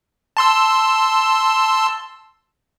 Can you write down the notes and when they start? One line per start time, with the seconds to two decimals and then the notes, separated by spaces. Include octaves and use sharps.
0.37 A5 C6 E6